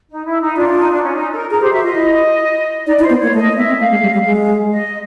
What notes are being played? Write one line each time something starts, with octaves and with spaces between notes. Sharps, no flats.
D#4
E4
D#4
D4 F4
D4
D#4
D4
C#4
D#4
A4
A#4
G#4 A#4
G4 C5
F#4 E5
F4 D#5
E4
D#4 D5
E4
C5
B3
C5
A#3 C#5
A3 D#5
B3 E5
C4
A3 F5
G#3
G3
G3
G#3
D#5